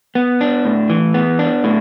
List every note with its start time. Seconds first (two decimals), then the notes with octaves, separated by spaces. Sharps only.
0.15 B3
0.41 D4
0.65 A2
0.90 E3
1.14 B3
1.39 D4
1.64 A2